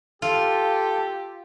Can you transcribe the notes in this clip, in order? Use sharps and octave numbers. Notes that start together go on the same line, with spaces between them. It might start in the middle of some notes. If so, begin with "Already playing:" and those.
F4 G4 A4